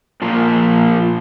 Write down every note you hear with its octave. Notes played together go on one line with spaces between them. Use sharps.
A#2 F3 A#3